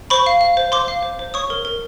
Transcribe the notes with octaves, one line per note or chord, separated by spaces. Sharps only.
C5 B5 C#6
F5
F5
C5
C5 C6 D6
F5
C5
C5
C#5 C#6 D#6
A#4
A#4